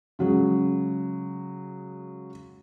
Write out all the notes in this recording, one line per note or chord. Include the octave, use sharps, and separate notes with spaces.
C#3 F#3 G#3